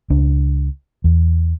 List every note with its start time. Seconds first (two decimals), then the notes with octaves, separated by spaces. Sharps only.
0.10 C#2 D4
1.04 E2